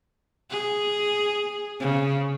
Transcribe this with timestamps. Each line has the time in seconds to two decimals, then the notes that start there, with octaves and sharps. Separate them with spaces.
0.50 G#4
1.80 C#3